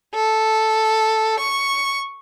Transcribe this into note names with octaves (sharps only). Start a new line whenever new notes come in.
A4
C#6